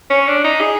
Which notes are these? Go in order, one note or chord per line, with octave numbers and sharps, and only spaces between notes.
C#4
D4
D#4
G#4